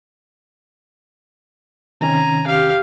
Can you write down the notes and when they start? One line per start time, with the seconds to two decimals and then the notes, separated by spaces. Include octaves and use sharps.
2.01 C3 D#3 C#4 G#5 A#5
2.47 G4 F5